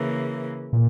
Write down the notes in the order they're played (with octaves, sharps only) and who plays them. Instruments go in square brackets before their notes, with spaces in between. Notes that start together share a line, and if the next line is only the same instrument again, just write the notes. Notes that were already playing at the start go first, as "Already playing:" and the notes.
Already playing: [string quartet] C#3 E3 A#3
[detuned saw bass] A#2